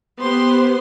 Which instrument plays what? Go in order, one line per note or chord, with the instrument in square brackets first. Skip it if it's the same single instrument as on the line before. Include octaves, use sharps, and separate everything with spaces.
[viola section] B3 G4 C5 C6